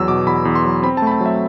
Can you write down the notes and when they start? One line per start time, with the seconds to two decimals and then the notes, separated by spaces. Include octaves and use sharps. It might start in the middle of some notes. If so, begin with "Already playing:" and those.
Already playing: E2 F#3 E6
0.08 B2 D6
0.26 E2 B5
0.45 E2
0.55 C6
0.65 F#3
0.83 C4 B5
0.97 A5
1.02 A3 B5
1.12 A5
1.21 F#3
1.26 E5